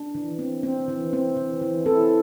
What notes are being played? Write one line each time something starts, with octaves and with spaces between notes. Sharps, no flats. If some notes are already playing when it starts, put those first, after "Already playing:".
Already playing: D4
E3
C4
C4
E3
C4
E3
E3
C4 E4 A4